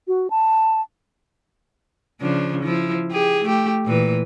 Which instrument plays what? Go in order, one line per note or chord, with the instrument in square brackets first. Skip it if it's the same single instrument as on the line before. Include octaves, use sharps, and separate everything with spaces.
[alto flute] F#4
A5
[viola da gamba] C#3 F3 D4
F3 E4
G4 G#4
A3 G4
A#2 E3 B4